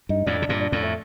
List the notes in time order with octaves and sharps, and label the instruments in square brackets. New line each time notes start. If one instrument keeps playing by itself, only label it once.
[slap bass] G2 [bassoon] D#4
[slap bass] F2 A2 [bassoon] D4
[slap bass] C3
G2 A#2
[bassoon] D4
[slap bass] F2 A2
[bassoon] A3